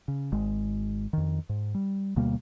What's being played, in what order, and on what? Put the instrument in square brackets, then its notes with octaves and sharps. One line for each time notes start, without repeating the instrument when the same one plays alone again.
[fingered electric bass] C#3
G#1 G#3
F2 D#3
G#2
G3
D2 B2 G3 A#3